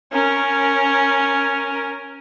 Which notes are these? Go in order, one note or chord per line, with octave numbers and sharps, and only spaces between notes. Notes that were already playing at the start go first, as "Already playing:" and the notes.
C#4 A#4